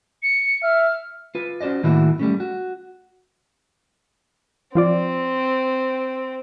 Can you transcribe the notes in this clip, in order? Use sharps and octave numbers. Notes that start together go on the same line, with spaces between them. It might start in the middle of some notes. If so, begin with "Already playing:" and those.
C#7
E5 F6
F4 B4
C#4 F#4 C5 D5 D#5
A2 D#3 A#3 E4 F#4
G3 A3 C#4
F#4
F3 C4 F4 D5